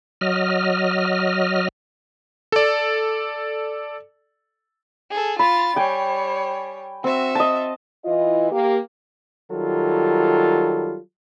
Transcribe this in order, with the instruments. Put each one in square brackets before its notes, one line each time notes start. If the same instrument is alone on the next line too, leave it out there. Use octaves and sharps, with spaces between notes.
[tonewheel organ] F#3 D#5 F6
[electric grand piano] A4 D5
[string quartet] G#4 A4
[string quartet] F4 A6 [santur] B5
[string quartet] G3 C#5 [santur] G5 G#5
[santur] C4 [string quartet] F#4 E5
[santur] D#5 A5
[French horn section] E3 E4 F4 D#5
A#3 G4
[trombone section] D#3 F#3 G3 F4 A4